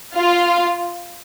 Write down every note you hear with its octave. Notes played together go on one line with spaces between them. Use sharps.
F4 F5